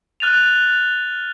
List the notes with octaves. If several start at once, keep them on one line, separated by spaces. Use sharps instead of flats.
F6 F#6 A6 D#7 F7